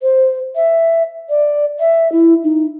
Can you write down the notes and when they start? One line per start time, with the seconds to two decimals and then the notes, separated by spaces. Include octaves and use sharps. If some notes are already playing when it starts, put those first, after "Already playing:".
0.01 C5
0.55 E5
1.29 D5
1.79 E5
2.12 E4
2.44 D#4